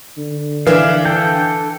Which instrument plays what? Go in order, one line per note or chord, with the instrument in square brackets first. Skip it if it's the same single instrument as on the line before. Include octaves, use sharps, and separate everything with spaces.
[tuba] D3
[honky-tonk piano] E3 [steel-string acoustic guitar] D4 D5 E5 [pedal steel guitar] F5
[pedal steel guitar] A4 G5